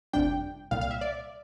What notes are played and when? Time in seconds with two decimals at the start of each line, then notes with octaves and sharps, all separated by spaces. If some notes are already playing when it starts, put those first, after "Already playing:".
0.13 G1 F2 C3 G3 D4 G5
0.71 C2 A#2 G3 F5
0.81 F5
0.91 E5
1.01 D5